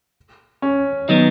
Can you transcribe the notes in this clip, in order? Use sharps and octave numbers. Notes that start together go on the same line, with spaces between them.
C#4
D#3 F#3 B3 D#4